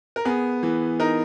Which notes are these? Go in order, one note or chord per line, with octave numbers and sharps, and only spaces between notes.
A#4
B3 G#4
E3
D#4 A#4